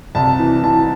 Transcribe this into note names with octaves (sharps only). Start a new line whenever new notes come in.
C2 A5
E3
E3 A5